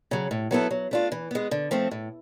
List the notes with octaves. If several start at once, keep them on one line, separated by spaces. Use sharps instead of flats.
C#3 F#3
A2
F#3 B3 E4 A4
F#3
A3 D4 F4
E3
G#3 B3
D3
F3 A3 C4
A2